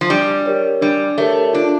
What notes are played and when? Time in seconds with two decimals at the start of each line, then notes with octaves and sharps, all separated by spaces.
0.01 F3
0.10 G3 D4
0.46 G4 A#4 C#5
0.81 G3 D4
1.18 A3 G4 A#4 C#5
1.53 D4 F4